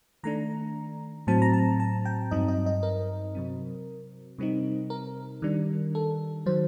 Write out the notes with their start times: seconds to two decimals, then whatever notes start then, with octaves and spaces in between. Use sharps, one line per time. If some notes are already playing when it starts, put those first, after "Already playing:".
0.23 D#3 A3 D4 A#5
1.27 A2 F#3 C4 A5
1.42 A#5
1.53 A5
1.80 A5
2.05 G5
2.31 G2 F#3 C4 D#4 D#5
2.48 D#5
2.66 D#5
2.83 A#4
3.35 C3 F#3 C4
4.39 C3 G3 C4 D#4
4.90 A#4
5.42 D#3 G3 D4
5.95 A4
6.46 D#3 F#3 C5